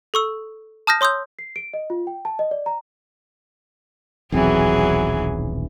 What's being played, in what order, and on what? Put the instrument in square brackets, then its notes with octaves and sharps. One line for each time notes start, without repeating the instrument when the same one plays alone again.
[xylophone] A4 C#6 E6
A5 D#6 F6 G6 A#6
C#5 C6 D#6 E6 G6
[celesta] C7
D7
D#5
F4
G5
A5
D#5
D5
A#5
[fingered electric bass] D#1 B1 C4 [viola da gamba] E3 F#3 G#4